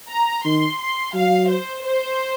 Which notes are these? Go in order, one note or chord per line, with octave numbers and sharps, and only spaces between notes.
A#5
D#3 C6
C6
F#3 F5
C5
C5